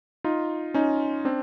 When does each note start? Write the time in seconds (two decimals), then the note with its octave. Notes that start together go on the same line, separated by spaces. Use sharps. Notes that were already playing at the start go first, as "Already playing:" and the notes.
0.24 D#4 F4
0.74 C#4 D#4
1.25 C4 D4